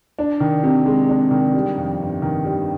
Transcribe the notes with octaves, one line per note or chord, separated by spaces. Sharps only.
D4
D#3
C3
G#3
D4
D#3
G3
F2
G1
D#3
G3